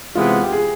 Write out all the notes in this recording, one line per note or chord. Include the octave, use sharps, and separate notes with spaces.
C3 E3 G#3 B3 F4
G4
G#4